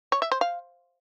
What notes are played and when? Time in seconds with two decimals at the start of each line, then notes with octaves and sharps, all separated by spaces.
0.12 C#5
0.22 E5
0.32 C5
0.41 F5